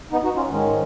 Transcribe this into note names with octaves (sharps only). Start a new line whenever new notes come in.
B3 D#4
D#4 F#4
C#4 F4
G#2 D#3 G#3 C#4